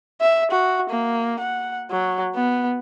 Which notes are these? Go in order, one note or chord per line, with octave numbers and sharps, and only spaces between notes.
E5
F#4
A#3
F#5
F#3
B3